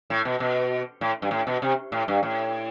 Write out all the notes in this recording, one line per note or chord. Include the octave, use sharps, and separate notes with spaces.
A2
B2
B2
A2
G2
A2
B2
C3
A2
G2
A2